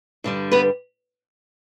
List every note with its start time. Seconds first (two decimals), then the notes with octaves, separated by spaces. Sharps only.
0.24 G2 D3 G3
0.51 B3 B4